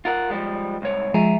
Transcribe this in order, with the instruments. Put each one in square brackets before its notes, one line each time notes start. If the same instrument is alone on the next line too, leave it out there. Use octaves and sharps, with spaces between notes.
[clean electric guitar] F4 A#4 F#5
F3 G3 G#3
C2 G#2 C#5
[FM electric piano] F3 G#3 [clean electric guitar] E5 G#5 A#5